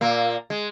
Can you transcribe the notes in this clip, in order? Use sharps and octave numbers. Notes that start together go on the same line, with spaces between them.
A#2 A#3
G#3